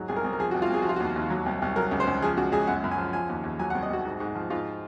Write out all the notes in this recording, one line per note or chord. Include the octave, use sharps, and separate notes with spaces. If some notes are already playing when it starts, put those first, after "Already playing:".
Already playing: G#2 F#3
C2 G#4
A#4
C2
A#4
F3 G#4
F#4
C2
F4
C2 G#4
F#4
F3 F4
D#2 F#4
D#2
F#3
C2
C2
F#3 A#4
C#2
C5
C#2
F3 G#4
C#2 F#4
C#2 G#4
F#2 F#5
F#2
G#5
F3
F3 G#5
D#2
D#2
F#3 G#5
F#5
C2
D#5
C2 F#4
G#2
G#2
F3
G#2 F4